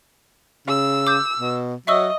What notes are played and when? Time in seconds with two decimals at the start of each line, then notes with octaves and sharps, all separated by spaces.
0.68 C#3 E6
1.07 D6 G6
1.39 B2
1.87 F#3 D#5 E5 C#6 E6